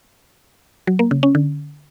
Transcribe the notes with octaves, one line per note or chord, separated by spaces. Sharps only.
F#3
A#3
C#3
C#4
D3